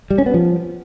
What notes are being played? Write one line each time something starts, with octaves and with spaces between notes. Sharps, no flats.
G3
C#4
B3
F3